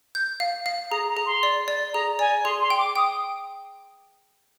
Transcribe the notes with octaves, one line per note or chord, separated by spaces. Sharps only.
G6
F5
F5
G#4 A#5
A#5
G#4
C6
D5
D5
G#4 A#5
D5 G#5
G#4 C6
C6
G5
D6
G5 D#6